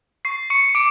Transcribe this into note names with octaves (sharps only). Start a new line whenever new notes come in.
C#6 C7
C#6 C#7
C#6
D6 D7